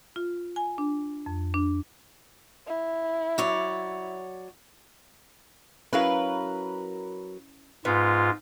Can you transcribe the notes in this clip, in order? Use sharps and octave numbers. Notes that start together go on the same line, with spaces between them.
F4
G#5
D4
F2
D4
E4
F#3 C#5 D5
F#3 C#4 E4 A#4 B4 F5
G#2 B3 F4